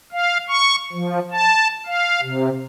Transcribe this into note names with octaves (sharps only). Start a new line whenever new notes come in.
F5
C#6
F3
A5
F5
C3